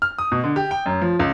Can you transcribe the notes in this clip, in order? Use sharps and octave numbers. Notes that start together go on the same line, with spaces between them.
F6
D#6
B2
D3
G4
G5
F#2
F3
C#2